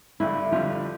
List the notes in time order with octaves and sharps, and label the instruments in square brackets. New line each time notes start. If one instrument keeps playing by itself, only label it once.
[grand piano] G1 G2 D3 [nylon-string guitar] E4
[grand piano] G1 F2 D3 G3 [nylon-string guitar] F4